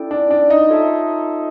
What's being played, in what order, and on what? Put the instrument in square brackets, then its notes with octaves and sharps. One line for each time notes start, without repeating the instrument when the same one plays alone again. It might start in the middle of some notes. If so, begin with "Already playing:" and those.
Already playing: [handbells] C#4 E4 A4 D5 G5
[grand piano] D4
D4
D#4
[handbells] F4 A4 C#5 E5 A5